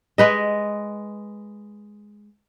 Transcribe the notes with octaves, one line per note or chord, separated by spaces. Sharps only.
G#3 B4 D#5